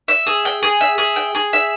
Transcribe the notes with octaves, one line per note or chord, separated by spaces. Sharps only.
E5
G#4
G5
G#4
E5
G#4
G5
G#4
E5